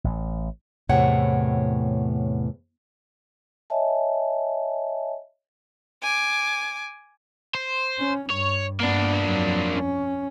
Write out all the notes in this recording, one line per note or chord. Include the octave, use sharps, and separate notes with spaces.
A1
E2 A2 C3 C#5 F#5 G5
C#5 D#5 E5 G#5 A5
G#5 D6
C5
C#4
G2 C#5
G2 A#3 B3 D4
F2 F#3
C#4